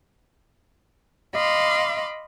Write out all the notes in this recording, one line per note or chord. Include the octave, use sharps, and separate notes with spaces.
D#5 F5 B5 C6 D6